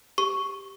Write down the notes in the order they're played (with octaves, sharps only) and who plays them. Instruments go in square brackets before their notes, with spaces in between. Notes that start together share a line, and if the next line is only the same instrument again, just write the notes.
[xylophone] G4 C#6